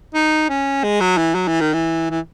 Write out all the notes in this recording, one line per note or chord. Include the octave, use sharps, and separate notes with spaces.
D#4
C#4
G#3
F#3
E3
F#3
E3
D#3
E3
E3